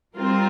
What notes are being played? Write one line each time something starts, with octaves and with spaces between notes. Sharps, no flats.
G3 C4 F4 A#4